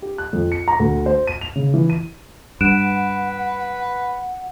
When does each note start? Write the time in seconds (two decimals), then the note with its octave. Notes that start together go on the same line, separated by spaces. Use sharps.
0.02 G4
0.18 F#6
0.33 F2
0.52 C#7
0.68 A#5
0.80 D2
1.06 C5
1.27 D#7
1.41 F7
1.56 C#3
1.74 E3
1.90 D#7
2.61 G2 B4 F#5 F#6 D7 E7